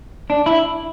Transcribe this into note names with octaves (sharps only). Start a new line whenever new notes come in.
D4
E4